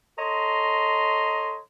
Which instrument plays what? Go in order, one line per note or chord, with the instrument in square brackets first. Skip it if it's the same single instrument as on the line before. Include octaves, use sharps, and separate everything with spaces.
[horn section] A4 C#5 D#5 A#5 C6